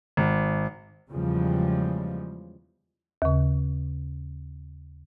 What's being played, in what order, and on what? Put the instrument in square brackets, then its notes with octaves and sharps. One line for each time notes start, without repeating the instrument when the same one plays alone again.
[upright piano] G#1
[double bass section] E2 C#3 F3 G3 G#3
[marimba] D#2 C#3